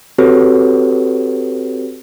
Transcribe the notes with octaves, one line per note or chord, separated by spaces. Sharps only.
C4 F#4 G4 A4 B4 C#5